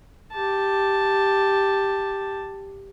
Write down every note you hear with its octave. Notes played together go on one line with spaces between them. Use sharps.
G4 A5